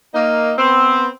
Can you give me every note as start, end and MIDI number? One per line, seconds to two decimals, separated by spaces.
0.14 0.52 58
0.14 0.52 63
0.58 1.06 59
0.58 1.06 60